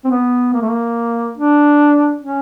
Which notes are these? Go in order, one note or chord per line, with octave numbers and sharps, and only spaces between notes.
C4
B3
A#3
A3
A#3
D4
C#4